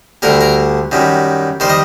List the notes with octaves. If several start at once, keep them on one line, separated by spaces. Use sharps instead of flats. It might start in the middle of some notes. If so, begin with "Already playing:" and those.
D2 D3 G3 A#4
A#4
F#2 D#3 G3
D#3 G3 C5
D#5